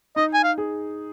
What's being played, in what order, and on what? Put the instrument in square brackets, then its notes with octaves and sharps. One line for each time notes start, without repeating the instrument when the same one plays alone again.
[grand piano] D#4 [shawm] D#5
[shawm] G#5
F5
[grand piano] G#4